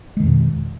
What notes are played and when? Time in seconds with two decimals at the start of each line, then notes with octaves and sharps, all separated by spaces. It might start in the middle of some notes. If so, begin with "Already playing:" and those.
0.17 G#3
0.20 D#3
0.23 F2
0.27 B2